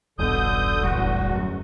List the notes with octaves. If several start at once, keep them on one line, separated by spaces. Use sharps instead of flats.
E1 B1 G2 B2 D3 D#6 G6
D1 E2 G3 F#4
F#2